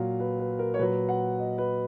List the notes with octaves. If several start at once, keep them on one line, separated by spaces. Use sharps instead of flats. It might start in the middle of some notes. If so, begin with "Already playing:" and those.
Already playing: A#2 F#3 F5
B4
B4
A#4
C#5
A#2 F#3 B4
F#5
D#5
B4